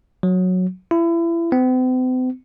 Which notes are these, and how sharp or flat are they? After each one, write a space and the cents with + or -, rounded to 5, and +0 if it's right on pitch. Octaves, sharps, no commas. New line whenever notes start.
F#3 -10
E4 +30
C4 -45